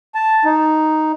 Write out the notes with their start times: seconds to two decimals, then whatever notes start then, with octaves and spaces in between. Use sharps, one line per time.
0.15 A5
0.45 D#4